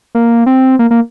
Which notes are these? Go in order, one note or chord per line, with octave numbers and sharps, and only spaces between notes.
A#3
C4
A#3
A#3